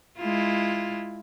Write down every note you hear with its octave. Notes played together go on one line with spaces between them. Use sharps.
G#3 E4 F4